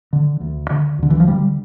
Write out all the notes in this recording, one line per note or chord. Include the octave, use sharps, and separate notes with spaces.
D3
D2
D3
D2 D3
E3
F3
D3 G3